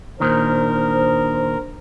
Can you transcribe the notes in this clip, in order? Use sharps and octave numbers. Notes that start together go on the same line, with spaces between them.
A#2 D#3 D4 A#4 C5